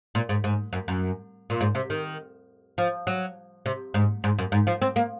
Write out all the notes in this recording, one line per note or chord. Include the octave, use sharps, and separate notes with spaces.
A#2
G#2
G#2
F#2
F#2
A#2
G#2
C3
D#3
F3
F#3
C3
G#2
G#2
F#2
G#2
F3
C4
A#3